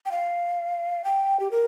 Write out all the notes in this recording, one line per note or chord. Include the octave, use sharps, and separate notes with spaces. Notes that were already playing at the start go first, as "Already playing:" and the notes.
G5
F5
G5
G4
A#4